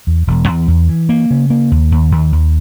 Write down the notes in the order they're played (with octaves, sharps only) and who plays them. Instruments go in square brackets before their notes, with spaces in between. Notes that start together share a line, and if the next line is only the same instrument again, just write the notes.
[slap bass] E2
E1
E2
E2
E3
A#3
C#3
A#3
D#2
D#2
D#2
D#2